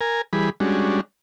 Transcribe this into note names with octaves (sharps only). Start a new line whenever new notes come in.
A#4 G#5
E3 G3 G#4 B5
G3 G#3 C#4 D4 F#4